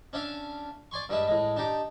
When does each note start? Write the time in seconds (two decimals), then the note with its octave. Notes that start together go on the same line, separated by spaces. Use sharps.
0.13 C#4 D4 E5 F5
0.91 D5 G#5 C6 C#6
1.09 G2 G3 G#3 E5
1.27 A2 G#3
1.56 D4 D#4 G4